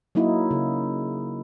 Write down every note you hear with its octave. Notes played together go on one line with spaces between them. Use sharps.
F#3 A#3 D#4 E4
C#3